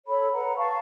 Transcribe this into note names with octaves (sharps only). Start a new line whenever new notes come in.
A4 C#5 B5
B4 F#5 A#5
F5 A5 C#6